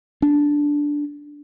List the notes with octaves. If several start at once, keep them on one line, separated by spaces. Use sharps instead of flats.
D4